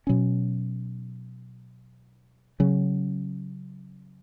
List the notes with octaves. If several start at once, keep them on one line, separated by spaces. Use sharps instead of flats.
B2 F#3 C#4
C#3 F#3 C#4